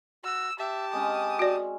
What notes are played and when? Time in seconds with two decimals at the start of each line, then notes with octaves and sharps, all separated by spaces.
0.24 F#4 E6
0.59 G4 E5 A5
0.93 G#3 C4 C#4 D#6
1.39 F#4 D5